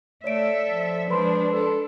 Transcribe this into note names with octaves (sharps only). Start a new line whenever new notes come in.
A3 A4 C#5 D5 E5 D7
F3
F3 G#3 D4 B4 B5 C6
A4